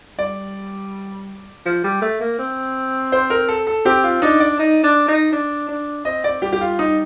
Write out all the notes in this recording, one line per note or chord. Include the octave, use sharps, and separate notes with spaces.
G3 D5
F3
G3
A3
A#3
C4
C5
A#4
A4
A4
C4 G4
F4
D4 D#4
D5
D#4
D4
D#4
D4
D4
C4 D#5
D5
G3 G4
G4
F4
D#4